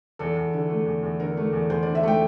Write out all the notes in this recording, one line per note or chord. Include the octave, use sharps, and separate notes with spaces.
E2 A4
E2
D3
A3
E2
E2
D3 A#4
A3
E2
E2 C5
D5
D3
E5
A3 G5